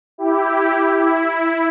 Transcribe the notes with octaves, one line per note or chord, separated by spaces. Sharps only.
E4 G4
E4